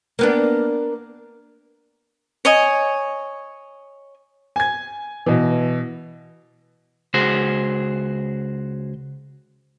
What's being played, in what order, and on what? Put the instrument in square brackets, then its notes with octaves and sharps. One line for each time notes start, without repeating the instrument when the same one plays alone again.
[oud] A#3 B3 D4
[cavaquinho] C#5 D#5 G#5
[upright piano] G#5 G#6
B2 E3
[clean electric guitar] C#2 F#4 G#4 C5